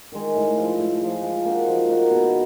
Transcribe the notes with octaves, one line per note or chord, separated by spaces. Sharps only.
D#3 G#3
A2
F3 G#3
A2
F3 G#3
F3
A#3 D#4 F#4
F3
A#3 D#4 F#4
B2